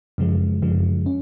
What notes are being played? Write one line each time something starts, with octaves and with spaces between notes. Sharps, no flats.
F#2 C#3 F3 G#3
F#2 C#3 F3 G#3
C#4